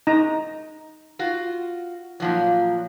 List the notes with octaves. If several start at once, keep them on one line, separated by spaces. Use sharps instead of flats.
D#4 A#5
F4 F#4
A#2 F3 F#3